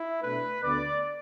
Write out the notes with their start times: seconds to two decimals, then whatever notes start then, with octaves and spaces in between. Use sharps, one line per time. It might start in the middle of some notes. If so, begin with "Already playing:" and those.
Already playing: E4
0.22 B2 A3 D4 B4
0.63 D2 D3 B3 D5